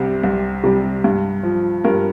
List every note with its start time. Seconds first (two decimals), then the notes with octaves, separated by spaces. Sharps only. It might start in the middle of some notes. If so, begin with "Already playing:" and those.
Already playing: C2 C3 G3
0.23 C2
0.63 C3 G3
1.04 G2
1.43 F3
1.84 G2 A#4